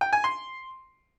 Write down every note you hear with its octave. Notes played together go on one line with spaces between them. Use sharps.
G5
G#5
C6